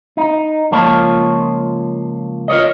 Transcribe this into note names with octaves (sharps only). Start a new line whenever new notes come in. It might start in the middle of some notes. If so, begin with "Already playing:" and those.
D#4
C#2 F3 A#3 F4 C#5 A5
F4 A#4 C#5 D#5